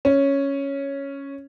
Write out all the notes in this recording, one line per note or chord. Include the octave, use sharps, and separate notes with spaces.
C#4